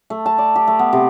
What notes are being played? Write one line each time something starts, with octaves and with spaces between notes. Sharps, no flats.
A3
A5
D5
G4
A3
B3
C3